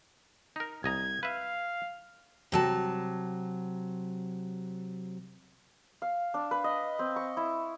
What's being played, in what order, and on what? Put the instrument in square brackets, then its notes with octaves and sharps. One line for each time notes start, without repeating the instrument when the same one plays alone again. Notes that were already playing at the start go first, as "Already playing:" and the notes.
[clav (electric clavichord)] D#4 A#4
[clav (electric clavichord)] C2 D#5 A#5 [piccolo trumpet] G#6
[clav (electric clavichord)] B4 E5 [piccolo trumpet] F5
[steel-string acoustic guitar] C3 F#3 A5
[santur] F5
D4
B4
D#5
C4
C#6
E4